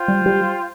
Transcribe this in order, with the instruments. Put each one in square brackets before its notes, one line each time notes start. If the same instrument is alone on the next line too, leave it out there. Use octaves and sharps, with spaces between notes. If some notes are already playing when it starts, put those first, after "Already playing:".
Already playing: [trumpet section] F4 C5 G5
[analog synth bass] G3
G3